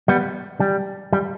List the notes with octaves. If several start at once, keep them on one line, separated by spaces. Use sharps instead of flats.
G3 B3
G3
G3